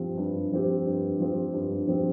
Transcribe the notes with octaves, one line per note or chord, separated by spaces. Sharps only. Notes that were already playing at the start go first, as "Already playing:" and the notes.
Already playing: G2 F3 C4 G4
G2
F3 C4 G4
G2
F3 C4 G4
G2
F3 C4 G4